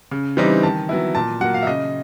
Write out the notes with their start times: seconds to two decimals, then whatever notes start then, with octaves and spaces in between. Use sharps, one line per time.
0.11 C#3
0.37 E3 G3 C4 D#4
0.63 D#3 A5
0.89 F#3 B3 E4
1.15 A#2 A5
1.41 F#3 A#3 F#5
1.54 F5
1.63 E5
1.67 C#3 D#5